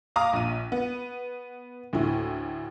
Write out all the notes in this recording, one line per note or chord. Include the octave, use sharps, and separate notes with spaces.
F5 A#5 D6 D#6
A#1 D#7
B3
D2 A2 E4